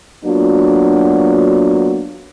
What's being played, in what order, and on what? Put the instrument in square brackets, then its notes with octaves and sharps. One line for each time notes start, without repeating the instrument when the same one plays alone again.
[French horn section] F#3 A#3 B3 D4 F4 F#4